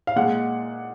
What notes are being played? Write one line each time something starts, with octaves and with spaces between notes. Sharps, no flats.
F5
A#2 G#3 F#5